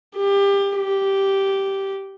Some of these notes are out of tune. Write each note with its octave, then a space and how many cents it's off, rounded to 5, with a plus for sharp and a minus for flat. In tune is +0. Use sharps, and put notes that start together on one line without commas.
G4 +25
G4 -5